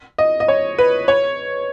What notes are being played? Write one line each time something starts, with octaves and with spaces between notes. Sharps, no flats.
D#5
D#5
C#5
B4
C#5